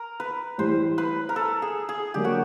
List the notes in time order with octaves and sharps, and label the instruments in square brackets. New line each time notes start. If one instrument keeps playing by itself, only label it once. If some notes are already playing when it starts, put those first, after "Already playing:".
Already playing: [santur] A#4
B4
[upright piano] A2 E3 G3 [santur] C5
[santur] B4
A#4
A4
G#4
G#4
[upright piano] D3 F#3 A#3 [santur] G4
[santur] F#4